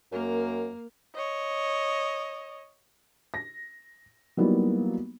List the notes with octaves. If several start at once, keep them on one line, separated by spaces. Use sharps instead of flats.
F#2 A#3 A#4
C#5 D#5
A#6
F#3 G3 A#3 B3 D#4 E4